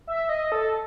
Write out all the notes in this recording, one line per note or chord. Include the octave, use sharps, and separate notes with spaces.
E5
D#5
A4